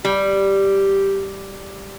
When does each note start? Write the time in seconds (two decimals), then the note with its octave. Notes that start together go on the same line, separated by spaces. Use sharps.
0.05 G3 G4